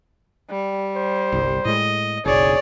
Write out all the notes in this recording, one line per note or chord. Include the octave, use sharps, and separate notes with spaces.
G3
C5
G1 C2
A2 G#3 D#5
F#1 B1 G#4 C#5 D5